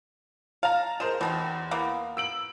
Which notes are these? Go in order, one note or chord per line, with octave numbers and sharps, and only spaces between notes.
F5 A5 A#5
G#3 A#4 C5 E7
E2 B2 D#3 C4
E3 A#3 B3
E6 D7 F#7